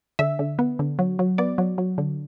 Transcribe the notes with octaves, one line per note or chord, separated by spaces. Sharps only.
D3 E5
D3
B3
D3
F#3
F#3
B3 D5
F#3
F#3
D3